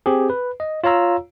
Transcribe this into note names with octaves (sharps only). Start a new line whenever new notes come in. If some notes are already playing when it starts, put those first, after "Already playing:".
C4 G4 G#4
B4
D#5
F4 C#5 F5 A#5 E6